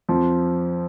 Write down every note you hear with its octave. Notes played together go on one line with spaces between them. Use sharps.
F2 F3